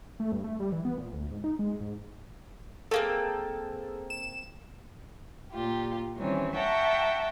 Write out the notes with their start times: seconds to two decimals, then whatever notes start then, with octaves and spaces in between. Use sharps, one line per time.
0.20 A3
0.32 G2
0.44 A3
0.60 G3
0.72 E3
0.85 B3
0.98 A#2
1.13 D2
1.31 G#2
1.44 D#4
1.59 G#3
1.80 G#2
2.91 A3 A#3 C4 G#4 A4
4.10 E7
5.52 A#2 F4 G4
6.16 D#3 E3 G3 C4 C#4
6.56 E5 F#5 G5 A5 A#5 C#6